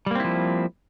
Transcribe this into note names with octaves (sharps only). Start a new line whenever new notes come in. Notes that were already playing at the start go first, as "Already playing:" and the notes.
F3 G3 A#3 C4 E4